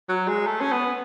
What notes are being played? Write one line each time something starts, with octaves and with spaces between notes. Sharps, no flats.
F#3
G#3
A3
C#4
B3